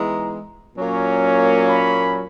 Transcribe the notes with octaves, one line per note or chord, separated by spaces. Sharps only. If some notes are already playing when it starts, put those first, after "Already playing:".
Already playing: G#2 E3 G#3 B3 A#5
A#2 F#3 A#3 C#4
B5